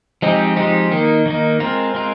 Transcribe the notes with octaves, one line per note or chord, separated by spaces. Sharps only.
F3 G#3 C4 D#4 G4
F3 G#3 C4 D#4 G4
D#3 A#3 D#4
D#3 A#3 D#4
G#3 C4 F4 A#4
G#3 C4 F4 A#4